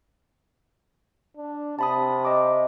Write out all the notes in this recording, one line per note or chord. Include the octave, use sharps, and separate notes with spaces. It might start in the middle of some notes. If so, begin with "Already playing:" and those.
D4
C3 A5 B5 D#6
D#5 D6